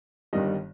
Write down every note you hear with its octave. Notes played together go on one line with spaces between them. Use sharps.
G1 G2 D#3 G3 D#5